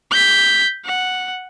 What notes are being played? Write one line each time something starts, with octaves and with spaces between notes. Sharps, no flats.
G6 B6
F#5